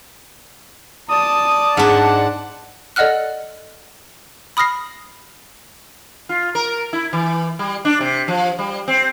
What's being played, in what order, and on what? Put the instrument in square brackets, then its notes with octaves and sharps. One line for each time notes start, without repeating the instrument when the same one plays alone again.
[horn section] D5 A5 [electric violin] D#6
[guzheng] G#2 D4 [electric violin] F#5
[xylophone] A4 D5 D#5 F#5 F6 F#6
B5 D#6 F6 A#6 C7
[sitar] F4
A#4
E4
E3
G3
D4
C3
F3
G3
C4